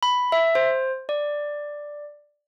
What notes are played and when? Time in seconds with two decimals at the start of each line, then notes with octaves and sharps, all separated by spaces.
0.03 B5
0.32 E5
0.55 C5
1.09 D5